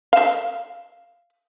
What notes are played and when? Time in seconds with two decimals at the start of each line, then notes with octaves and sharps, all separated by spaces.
0.13 E5 F5